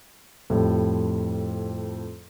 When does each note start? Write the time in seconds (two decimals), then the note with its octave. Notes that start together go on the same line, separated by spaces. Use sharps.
0.50 F2 A2 G3